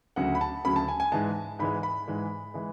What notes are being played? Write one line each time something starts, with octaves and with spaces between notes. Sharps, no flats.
D2 C#3 F#3 F#5
B5
A5
D2 C#3 F#3 B5
A5
G#5
G#5
G#2 E3 G#3 A5
G#2 E3 G#3 B5
B5
G#2 E3 G#3
E3 G#3